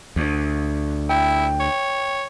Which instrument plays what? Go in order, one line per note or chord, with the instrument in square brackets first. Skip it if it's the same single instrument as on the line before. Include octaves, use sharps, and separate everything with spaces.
[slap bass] D2
[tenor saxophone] E4 [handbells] G5
[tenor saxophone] C#5